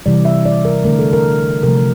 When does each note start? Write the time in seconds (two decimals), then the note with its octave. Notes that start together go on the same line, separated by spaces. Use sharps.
0.06 C3 E3 G3 D5
0.25 E5
0.46 D5
0.65 A#4
0.84 D3 A3 A#4
0.99 A4
1.13 A#4
1.63 C3 F3 A3 A#4